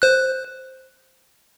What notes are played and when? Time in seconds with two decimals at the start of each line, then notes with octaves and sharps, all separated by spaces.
0.02 C5 F#6